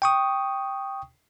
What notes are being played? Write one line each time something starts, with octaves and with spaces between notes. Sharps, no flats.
G5 C#6 D#6